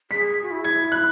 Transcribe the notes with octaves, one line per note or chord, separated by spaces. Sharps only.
G#4 B6
F#4
E4
G#6
F#6